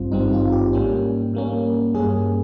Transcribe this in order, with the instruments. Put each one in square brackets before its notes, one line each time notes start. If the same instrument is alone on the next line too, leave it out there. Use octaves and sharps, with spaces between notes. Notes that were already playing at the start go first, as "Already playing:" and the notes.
Already playing: [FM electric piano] G#1 G2 G3 C4 F4
G#1 G2 G3 C4 D#4
F4
G4
G#2 G3 A#3 C#4
G#2 G3 A#3 C#4
G2 G3 A#3 C#4 G#4